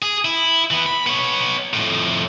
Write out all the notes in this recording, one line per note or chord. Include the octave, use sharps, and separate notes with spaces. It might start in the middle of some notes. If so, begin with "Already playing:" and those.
G#4
E4
E3 B3
B5
B3 C#5
F2 A2